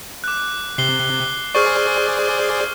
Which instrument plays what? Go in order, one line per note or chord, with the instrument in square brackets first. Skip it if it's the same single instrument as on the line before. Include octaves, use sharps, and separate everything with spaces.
[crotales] D6 F#6
[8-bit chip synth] C3 [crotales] C7 G7
[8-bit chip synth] G#4 C5 D5 [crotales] C#6 F6